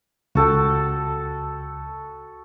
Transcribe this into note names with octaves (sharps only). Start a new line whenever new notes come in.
C#2 F#4 A4 G5